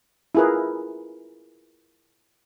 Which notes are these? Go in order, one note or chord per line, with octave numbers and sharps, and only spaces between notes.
E4 F4 G#4 A#4 B4